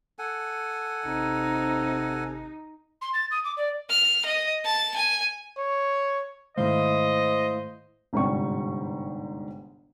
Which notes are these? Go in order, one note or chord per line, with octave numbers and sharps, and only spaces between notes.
A4 F#5 G#5
G#1 C3 D#4
C6
A6
D#6
D6
D5
F6
D#5
A5
G#5
C#5
G#2 D#3 G#3 A3 E4 C5 D#5 F5
G1 G#2 C3 G3 G5 C#6